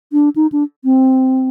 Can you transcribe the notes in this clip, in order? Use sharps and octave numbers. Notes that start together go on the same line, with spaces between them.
D4
D#4
D4
C4